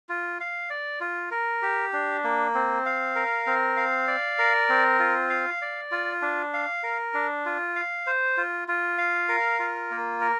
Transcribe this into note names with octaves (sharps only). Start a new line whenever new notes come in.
F4
F5
D5
F4
A#4
G4
D4
A#3
C4
F5
A#4
C4
F5
D5
A#4
C4
F4
F5
D5
F4
D4
F5
A#4
D4
F4
F5
C5
F4
F4
F5
A#4
F4
A#3
A#4